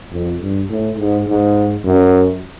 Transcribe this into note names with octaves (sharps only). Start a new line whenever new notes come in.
F2
G2
A2
G#2
G#2
F#2